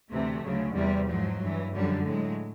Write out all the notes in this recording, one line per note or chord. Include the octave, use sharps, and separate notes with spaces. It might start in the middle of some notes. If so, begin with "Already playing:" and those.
D2 C3 E3 A3
D2 C#3 F#3
E2 C3 E3 G3
G#2 F3 F#3
G2 E3
F#2 D3 F3 G3
A2 F#3 G#3